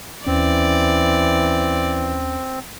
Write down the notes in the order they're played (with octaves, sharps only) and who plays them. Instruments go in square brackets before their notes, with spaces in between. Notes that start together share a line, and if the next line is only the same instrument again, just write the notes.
[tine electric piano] D#2 C#4 [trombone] E3 [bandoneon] C4 [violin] D5